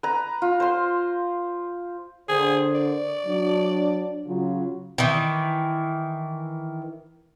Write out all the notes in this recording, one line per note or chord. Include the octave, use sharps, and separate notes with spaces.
B4 A#5
F4
C5 C6
D3 G#4 A#4 C5
D5
F#3 D4
C#3 F#3 F4
D#3 E3